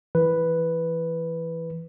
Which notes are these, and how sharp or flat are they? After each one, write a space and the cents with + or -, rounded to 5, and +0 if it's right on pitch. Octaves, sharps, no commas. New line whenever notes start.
E3 +0 B4 +0